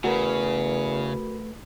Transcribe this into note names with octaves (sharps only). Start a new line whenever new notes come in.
E2 C#3 A3 F#4 A#4 B4